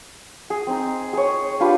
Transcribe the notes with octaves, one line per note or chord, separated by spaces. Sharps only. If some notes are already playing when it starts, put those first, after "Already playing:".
G#4
C4 D#4
G#4 C#5
D4 F4 G4 B4